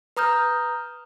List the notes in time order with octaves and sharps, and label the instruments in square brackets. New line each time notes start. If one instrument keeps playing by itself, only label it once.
[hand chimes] B4 A#5 D#6 F6 G6